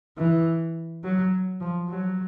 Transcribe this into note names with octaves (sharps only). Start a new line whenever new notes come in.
E3
F#3
F3
F#3